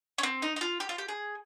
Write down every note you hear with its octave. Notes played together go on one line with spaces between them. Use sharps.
C#4
C4
D#4
D#4
F4
G4
F4
G4
G#4